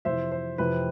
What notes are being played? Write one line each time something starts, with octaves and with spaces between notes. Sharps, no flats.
F2 C3 E3 C5 E5
C5
F2 C3 E3 B4